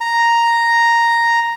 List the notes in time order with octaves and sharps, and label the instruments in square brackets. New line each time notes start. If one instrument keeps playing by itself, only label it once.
[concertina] A#5